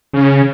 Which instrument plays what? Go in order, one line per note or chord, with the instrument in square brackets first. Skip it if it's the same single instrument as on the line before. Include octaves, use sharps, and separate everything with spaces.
[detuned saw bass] C#3